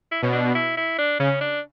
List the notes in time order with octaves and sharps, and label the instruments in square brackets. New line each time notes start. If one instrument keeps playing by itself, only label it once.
[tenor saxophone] E4
[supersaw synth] B2 [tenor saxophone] C#4
[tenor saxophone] D4
E4
E4
D4
[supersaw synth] C#3 [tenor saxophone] C#4
[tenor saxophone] D4